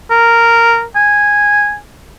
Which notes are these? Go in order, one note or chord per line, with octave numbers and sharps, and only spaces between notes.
A#4
G#5